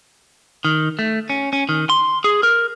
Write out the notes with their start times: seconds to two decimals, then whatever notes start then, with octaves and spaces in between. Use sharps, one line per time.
0.65 D#3
0.99 A3
1.30 C#4
1.53 C#4
1.69 D#3
1.90 C6
2.24 G#4
2.43 A#4